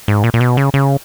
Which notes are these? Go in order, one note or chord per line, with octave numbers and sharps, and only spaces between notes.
G#2
A#2
A#2
B2
C#3
C#3